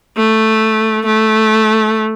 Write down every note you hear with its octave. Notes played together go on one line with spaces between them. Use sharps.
A3
A3